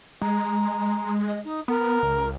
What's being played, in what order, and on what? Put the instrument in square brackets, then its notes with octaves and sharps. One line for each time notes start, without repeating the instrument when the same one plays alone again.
[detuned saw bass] G#3 [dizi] A#5
[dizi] D#5
D#4
[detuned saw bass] B3 [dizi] A#4
[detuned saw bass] C#2